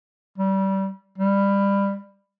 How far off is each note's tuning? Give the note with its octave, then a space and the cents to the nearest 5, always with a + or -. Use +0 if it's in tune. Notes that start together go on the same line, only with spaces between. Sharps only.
G3 -25
G3 +20